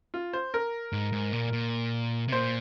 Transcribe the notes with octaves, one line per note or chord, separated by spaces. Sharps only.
F4
C5
A#4
G#2
G#2
A#2
A#2
C3
A#2 C5